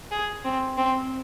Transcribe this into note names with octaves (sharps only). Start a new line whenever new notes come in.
G#4
C4
C4